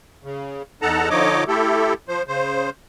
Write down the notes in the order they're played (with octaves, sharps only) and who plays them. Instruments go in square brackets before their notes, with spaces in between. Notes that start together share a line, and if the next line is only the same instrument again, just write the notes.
[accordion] C#3
E2 D#4 A4 F#5 A5 A#5
D3 F3 D#4 C#5 D#5 D6
A3 E4 G4 A4
F3 C5
C#3 C5